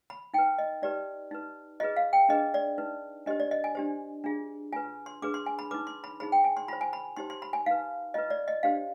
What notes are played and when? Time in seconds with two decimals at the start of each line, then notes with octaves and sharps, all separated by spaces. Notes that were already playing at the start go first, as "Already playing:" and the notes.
0.10 B5
0.34 D#4 G5
0.38 B4
0.58 D#5
0.82 D#4 G4 B4 D5
1.31 D#4 B4
1.80 F4 G#4 B4 D#5
1.97 F5
2.13 G5
2.29 D4 G#4 B4 D#5
2.54 D5
2.78 D#4 B4
3.26 D4 G4 C5 D#5
3.40 D5
3.51 D#5
3.64 G#5
3.75 D4 G4 C5
4.24 D4 F4 G#4
4.73 F4 B4 G#5
5.06 C6
5.22 D4 G#4 B4 D6
5.34 C6
5.46 G#5
5.59 B5
5.71 B4 D6
5.74 D#4
5.87 C6
6.04 B5
6.20 D#4 G#4 C5 B5
6.32 G5
6.44 G#5
6.57 C6
6.68 F4 C5 B5
6.81 G#5
6.93 B5
7.16 D#4 G4 C5 C6
7.30 C6
7.42 B5
7.53 G#5
7.66 D#4 B4 F5
8.14 F4 B4 D#5
8.30 D5
8.48 D#5
8.63 D4 G4 C5 F5